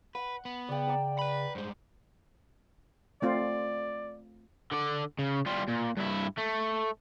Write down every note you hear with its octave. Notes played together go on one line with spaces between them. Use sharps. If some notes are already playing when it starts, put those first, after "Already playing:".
B4 F#5
B3
C#3 D5 G5
D5 A#5 E6
B4 B5
G2 G#3 C5
A3 C4 F4 D5
D3 D5
C#3
G3 F4
A#2
G2 E4
A3